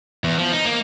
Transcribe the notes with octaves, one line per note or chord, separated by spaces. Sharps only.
E2
F3
D#4
A#3